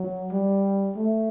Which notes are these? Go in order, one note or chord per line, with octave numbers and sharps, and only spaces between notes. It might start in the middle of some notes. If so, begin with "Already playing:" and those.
Already playing: F#3
G3
A3